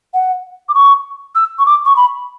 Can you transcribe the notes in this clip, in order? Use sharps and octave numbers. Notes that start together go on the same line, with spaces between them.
F#5
D6
C#6
E6
C#6
D6
C#6
B5